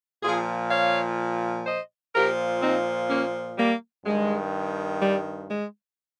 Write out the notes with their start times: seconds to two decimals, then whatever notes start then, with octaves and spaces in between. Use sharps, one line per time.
0.23 A#2 F3 F4 G#4
0.70 C#5 F5
1.66 C5 D#5
2.14 A#2 F3 G4 A#4
2.62 C4 D#4
3.10 A#3 C#4
3.58 G3 A#3
4.05 G2 D#3 G#3
5.02 G3
5.50 G#3